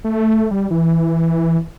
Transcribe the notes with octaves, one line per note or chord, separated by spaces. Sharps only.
A3
G3
E3